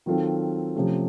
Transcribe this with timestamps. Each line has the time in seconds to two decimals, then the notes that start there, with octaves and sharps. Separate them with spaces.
0.06 D#3 F#3 C4 F4 A4
0.76 C3 F3 A3 C#4